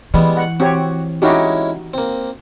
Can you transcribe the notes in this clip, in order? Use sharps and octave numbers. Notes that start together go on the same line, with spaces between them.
E3 G3 G#3 B3
F#5
C4 F#4 G4 C#5
G#3 C#4 D#4 E4 F#4 G4
A#3 C4